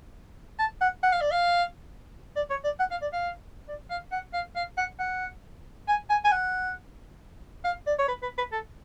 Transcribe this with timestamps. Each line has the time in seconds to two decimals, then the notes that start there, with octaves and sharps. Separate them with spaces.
0.59 A5
0.81 F#5
1.03 F#5
1.12 F5
1.21 D5
1.31 F5
2.36 D5
2.50 C#5
2.64 D5
2.80 F#5
2.91 F5
3.02 D5
3.13 F5
3.68 D5
3.90 F5
4.12 F#5
4.33 F5
4.56 F5
4.77 F#5
4.99 F#5
5.88 G#5
6.10 G#5
6.24 G#5
6.32 F#5
7.64 F5
7.87 D5
7.99 C#5
8.08 B4
8.23 B4
8.38 B4
8.52 A4